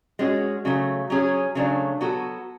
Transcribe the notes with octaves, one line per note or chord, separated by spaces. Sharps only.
G#3 C#4 F#4
C#3 F#3 A3
F#3 C#4 G#4
C#3 F#3 A3 D4
F#3 B3 F#4 A4